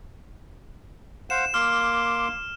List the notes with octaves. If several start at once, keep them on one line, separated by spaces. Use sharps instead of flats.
C5 F5 F#5 E7
A#3 C6 D6 F6